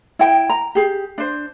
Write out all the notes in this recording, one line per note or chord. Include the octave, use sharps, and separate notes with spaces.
E4 G5
A#5
G4 G#4
D4 C5